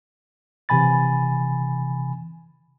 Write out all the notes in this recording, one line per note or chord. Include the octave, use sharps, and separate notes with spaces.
C3 E3 G#5 B5 A6